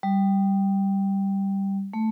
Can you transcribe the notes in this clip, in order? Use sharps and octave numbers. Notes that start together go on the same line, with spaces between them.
G3
A3